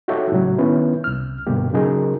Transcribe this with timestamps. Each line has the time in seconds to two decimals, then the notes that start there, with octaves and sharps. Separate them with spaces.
0.08 D#4 F#4 G4 A4 C#5 E5
0.32 A2 C#3 F#3
0.58 D#3 B3 C#4 E4 B4
1.04 C2 F6
1.47 G2 B2 D3 A#3 G4
1.73 C#3 F#3 C#4 D#4 G#4 A#4